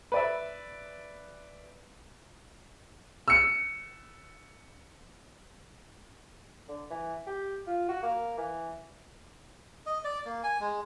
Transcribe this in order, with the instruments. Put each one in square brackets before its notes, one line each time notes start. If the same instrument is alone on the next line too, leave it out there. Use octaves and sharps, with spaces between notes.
[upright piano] B4 D5 E5
[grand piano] E6 C#7
[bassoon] D3
E3
G4
F4
F#4
A#3
E3
[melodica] D#5
D5
A#3
G#5
G#3